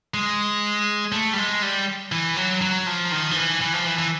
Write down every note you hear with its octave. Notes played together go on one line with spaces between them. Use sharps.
G#3
A3
G3
G#3
G3
E3
F#3
F#3
F3
D#3
F3
E3
E3
F3
E3
E3